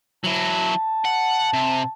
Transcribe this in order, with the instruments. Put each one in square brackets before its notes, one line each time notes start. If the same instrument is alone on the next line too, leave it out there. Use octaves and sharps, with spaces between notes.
[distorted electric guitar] F#3 E4 [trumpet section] A5
[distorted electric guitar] F#5
C3